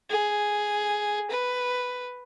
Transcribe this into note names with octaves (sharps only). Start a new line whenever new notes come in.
G#4
B4